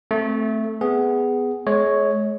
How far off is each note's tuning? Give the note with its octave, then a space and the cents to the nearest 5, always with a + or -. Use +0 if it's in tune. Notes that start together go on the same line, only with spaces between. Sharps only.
A3 +0 C4 +0
B3 +15 G#4 +0
G#3 +30 C#5 +0